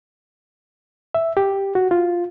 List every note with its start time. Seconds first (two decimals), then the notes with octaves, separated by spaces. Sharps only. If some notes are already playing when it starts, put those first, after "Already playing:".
1.15 E5
1.37 G4
1.75 F#4
1.91 F4